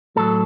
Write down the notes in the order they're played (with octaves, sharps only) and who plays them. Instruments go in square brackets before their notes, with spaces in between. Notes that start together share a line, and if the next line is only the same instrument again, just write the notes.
[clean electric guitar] A2 F#3 A4